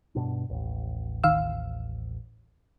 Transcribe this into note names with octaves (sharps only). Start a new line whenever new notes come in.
G2 B2 D4
A1 D#2
D#3 F5 E6